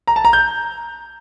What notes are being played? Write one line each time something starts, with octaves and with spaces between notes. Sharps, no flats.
A#5
A5
A#5
G6